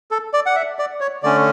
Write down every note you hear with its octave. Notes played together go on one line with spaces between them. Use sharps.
A4
D5
F#5
E5
D5
C#5
D3 A3 C#4 D5